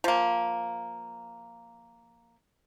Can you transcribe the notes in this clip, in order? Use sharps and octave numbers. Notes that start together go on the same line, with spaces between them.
F3 A#3